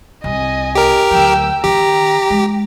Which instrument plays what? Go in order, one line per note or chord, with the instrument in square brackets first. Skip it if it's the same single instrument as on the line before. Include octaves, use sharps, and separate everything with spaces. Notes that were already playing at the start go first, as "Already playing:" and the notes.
[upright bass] C2 [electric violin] D#5 G#5
[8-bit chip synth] G4 A#4
[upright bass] D2 F#3 [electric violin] G5 E6
[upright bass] D#3 [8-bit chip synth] G4 [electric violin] A#5
[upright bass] G#3